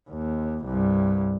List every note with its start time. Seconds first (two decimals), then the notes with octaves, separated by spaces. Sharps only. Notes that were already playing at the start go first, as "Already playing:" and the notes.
0.10 D#2
0.65 C2 G2